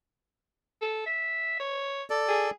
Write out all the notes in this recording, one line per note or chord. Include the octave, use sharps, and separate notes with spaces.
A4
E5
C#5
A4 D5
G#4